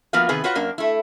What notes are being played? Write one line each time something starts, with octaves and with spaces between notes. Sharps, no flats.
F3 A#3 B3 F4 F#4 F5
C3 D#3 B3 G#4 B4
F4 F#4 B4 C#5 F5 F#5
F#2 A#3 D4
A3 E4